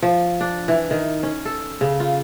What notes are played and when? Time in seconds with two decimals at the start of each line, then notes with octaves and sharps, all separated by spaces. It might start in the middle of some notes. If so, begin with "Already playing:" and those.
0.02 F3
0.41 D4
0.68 E3
0.91 D#3
1.23 C#4
1.45 A4
1.81 C#3
2.00 F4